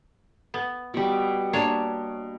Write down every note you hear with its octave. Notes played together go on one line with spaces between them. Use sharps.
B3
B2 G3
A#3 D4 C#5